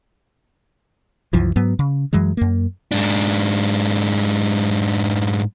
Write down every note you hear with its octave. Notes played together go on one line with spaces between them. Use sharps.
C2 F#2 E3 F3
G#2 F#3 B3
C#3
F#2 E3 F#3 G#3
F#2 A#3
G#2 D4